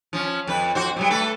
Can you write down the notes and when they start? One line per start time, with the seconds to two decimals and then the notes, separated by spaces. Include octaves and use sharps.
0.13 F3 C#4
0.47 F2 B4
0.75 F2 F#4 C5
0.96 A#2 F#3 G3
1.10 A3 A4 B4